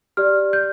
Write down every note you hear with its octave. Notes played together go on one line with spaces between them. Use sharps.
G4 D5 F6
G6